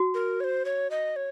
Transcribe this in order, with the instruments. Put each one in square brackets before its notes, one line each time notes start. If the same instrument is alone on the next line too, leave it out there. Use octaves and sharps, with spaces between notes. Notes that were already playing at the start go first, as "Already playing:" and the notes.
Already playing: [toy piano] F#4
[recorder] A#4
C#5
C5
C#5
D#5
C#5